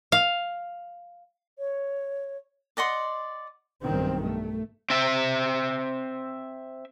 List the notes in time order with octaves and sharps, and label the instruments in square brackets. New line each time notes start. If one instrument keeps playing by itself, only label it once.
[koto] F5
[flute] C#5
[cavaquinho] D5 D#5 F#5 C6
[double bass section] B1 G2 D#3 C4
A3
[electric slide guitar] C4 E5